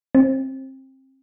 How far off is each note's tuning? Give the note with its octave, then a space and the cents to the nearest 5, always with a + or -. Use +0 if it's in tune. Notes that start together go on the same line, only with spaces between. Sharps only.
C4 +25